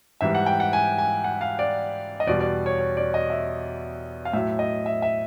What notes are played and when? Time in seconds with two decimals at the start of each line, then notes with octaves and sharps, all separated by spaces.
0.21 G#2 E3 G3 E5
0.35 F#5
0.46 G5
0.60 F#5
0.73 G#5
0.98 G#5
1.24 F#5
1.41 F5
1.59 D5
2.20 D#5
2.27 E2 B2 G3 D5
2.40 D5
2.66 C#5
2.79 C#5
2.97 D5
3.14 D#5
3.30 E5
4.25 F5
4.33 A2 F#3 E5
4.59 D#5
4.86 E5
5.02 E5